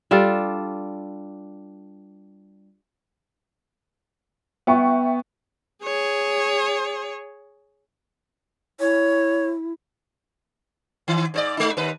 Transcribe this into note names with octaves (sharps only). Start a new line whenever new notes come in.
G3 D4 F4 A4
B3 E5 G5 C#6
G#4 C#5
E4 C#5
D#3
G#2 C5 D5
G#3 D#4
D#2 B4